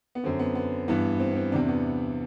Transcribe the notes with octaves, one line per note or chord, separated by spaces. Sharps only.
B3
F#2 D3 C4
B3
B3
G2 E3 B3
C4
B3
C4
E2 C3 E3 D4
B3